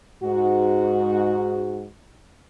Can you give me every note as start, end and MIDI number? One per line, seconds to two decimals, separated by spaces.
0.23 1.85 44
0.23 1.85 66